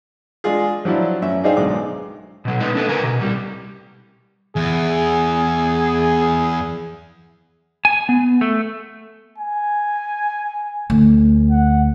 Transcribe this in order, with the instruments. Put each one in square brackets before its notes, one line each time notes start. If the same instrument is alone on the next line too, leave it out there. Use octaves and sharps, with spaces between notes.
[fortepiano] G#3 D4 F4 G#4
F3 F#3 D4 E4 F4
F#2 C#4 E5
D4 D#4 G#4 C5 F5 G5
B1 D3 G#3 D6
[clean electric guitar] B2 F#3
G#3 B3 D#4 B4
D4 A4 B4
C#3 F#3 A#4 G#5 A#5
B2
C2 G3
[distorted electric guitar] E2 [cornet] G#4
[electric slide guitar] G#5
B3
A3
[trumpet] G#5
[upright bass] D2
[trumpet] F#5